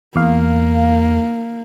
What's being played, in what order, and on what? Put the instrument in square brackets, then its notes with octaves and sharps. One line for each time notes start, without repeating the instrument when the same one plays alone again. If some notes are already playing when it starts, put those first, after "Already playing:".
[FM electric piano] E2 F5 [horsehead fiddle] A#3